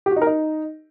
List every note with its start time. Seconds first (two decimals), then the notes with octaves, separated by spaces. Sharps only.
0.06 G4
0.11 F#4
0.16 D#4
0.22 A#4
0.27 D#4